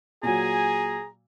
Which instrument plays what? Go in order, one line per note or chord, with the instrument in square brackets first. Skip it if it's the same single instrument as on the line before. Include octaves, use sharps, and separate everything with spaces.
[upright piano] A#2 F#3 [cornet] G#4 [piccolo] G#5 [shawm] A#5